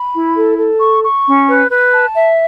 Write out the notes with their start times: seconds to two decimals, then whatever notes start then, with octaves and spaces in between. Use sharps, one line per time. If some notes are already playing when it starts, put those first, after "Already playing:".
Already playing: B5
0.14 E4
0.36 A4
0.58 A4
0.81 C#6
1.03 C#6
1.26 C#4
1.48 B4
1.70 B4
1.93 A5
2.15 E5